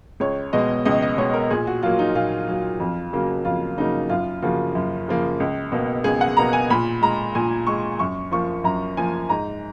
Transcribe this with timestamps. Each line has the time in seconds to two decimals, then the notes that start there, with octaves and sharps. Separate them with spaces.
0.20 C#2 C#5
0.53 B2 G#3 D#5
0.85 C#2 D#5
1.02 D#5
1.17 B2 G#3 C#5
1.34 A#4
1.50 A#2 G#4
1.67 F#4
1.83 F#3 A#3 F4
1.99 D#4
2.15 A#2 F4
2.48 F#3 A#3
2.80 F2
3.13 C#3 F#3 A#3
3.45 F2 F4
3.78 C#3 F#3 A#3 D#4
4.09 F#2 F4
4.42 C#3 F3 A#3 F#4
4.75 F#2
5.08 C#3 F3 A#3
5.40 C#2
5.72 B2 A#3
6.04 C#2 G#4
6.21 F#5
6.37 B2 A#3 A#5
6.53 G#5
6.70 A#2 B5
7.02 G#3 A#5
7.35 A#2 G#5
7.67 G#3 C#6
7.99 F#2 C#6
8.31 F3 A#3 C#6
8.64 F#2 A#5
8.97 F3 A#3 G#5
9.29 G#2 A#5